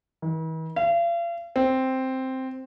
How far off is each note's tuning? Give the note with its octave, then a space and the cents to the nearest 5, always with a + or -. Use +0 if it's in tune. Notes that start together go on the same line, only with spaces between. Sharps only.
E3 -45
F5 -40
C4 +0